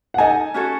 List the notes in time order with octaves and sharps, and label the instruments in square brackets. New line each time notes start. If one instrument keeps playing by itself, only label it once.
[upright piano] F#5
[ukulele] D#4 A4 D#5 [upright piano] G#5
[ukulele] C#4 F#4 A4 C#5